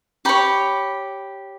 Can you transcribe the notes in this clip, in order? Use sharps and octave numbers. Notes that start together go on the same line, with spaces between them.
G4 C#5 B5